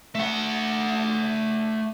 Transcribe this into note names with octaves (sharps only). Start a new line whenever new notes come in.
A3 F#5